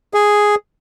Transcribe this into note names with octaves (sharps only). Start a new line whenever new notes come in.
G#4